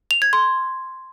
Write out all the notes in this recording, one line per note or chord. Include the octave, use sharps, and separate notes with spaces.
F7
G#6
C6